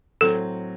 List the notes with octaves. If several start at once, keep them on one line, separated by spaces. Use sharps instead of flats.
A2 F#3 C4 A4